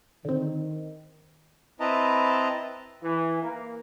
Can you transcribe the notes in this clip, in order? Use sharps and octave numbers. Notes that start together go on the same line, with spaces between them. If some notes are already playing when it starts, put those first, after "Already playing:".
D3 D#3 C4
C4 E4 B4 D#5 A5 A#5
E3
A#3